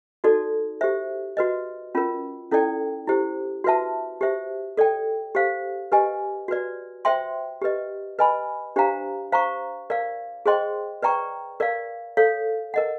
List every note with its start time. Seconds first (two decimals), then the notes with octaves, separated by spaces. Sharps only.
0.24 D#4 F#4 A4 D5
0.81 G4 C5 E5
1.37 F#4 B4 D#5
1.95 C#4 F4 A#4
2.51 C#4 E4 A4 D5 G5
3.07 E4 G4 C5
3.64 F#4 B4 E5 A5
4.21 G4 C5 E5
4.77 A4 D5 G5
5.35 G4 C5 F5
5.92 G4 B4 D#5 G#5
6.48 F#4 B4 D5
7.05 C5 E5 G5 C6
7.62 G4 B4 D#5
8.19 B4 D#5 G#5 B5
8.76 D4 G4 C5 F5 A#5
9.32 C5 F5 A#5 C#6
9.90 A#4 D5 F5
10.46 G#4 C5 D#5 G5 C6
11.02 B4 D5 G5 A#5 C#6
11.60 A#4 D5 F5
12.17 A4 C#5 F5
12.74 A#4 D#5 F#5